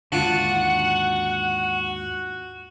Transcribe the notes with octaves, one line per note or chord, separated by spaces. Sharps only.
D#2 G#2 D3 D4 F4 F#4 F#5 D6